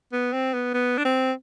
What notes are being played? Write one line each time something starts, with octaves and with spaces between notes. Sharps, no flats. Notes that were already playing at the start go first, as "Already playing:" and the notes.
B3
C4
B3
B3
D4
C4